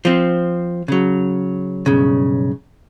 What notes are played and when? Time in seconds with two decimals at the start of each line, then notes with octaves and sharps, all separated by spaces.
0.05 F3 C4
0.88 C#3 F#3
1.86 B1 G2 C#3